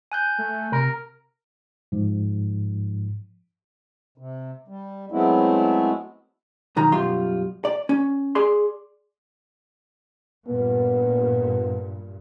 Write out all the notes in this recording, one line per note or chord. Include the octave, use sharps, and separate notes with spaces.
G#5 F#6 G6
A3
C3 A#4
G#2 F3
C3
G3
F#3 G#3 A3 B3 C4 E4
B1 D#3 A#5
F#2 B2 G3 F4 C6
D5
C#4
G#4 D5 C6
G2 A#2 B3